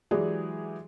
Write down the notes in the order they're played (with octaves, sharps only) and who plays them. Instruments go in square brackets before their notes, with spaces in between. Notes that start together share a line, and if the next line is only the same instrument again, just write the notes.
[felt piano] E3 F#3 G#3 G4 G#4 D5